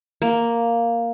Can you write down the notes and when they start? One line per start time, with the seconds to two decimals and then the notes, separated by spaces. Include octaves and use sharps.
0.22 A#3